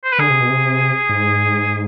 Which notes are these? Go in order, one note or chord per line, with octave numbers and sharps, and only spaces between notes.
C5
B4
D3 G#4
C3
B2
C3
G#2